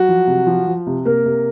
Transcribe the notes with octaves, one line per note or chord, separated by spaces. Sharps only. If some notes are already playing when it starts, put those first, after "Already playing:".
Already playing: F#3 F#4
F3
C3
F3
F3
C3
C3 A#3 A#4
C3